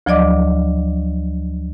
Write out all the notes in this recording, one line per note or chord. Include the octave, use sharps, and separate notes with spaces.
D2 F3 F#3 D5 D#5 D6